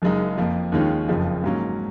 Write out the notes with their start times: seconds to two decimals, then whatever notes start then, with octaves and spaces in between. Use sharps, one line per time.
0.02 F#1 F#2 C#3 G#3 D#4
0.38 F2 F3 A#3
0.72 D#2 D#3 G#3 C#4 F4
1.08 F#1 F2 C#3 F3
1.44 G#2 F#3 A#3 C#4